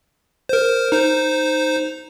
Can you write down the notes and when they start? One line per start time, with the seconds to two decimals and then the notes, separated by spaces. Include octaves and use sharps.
0.49 A#4 C5
0.92 D#4 C5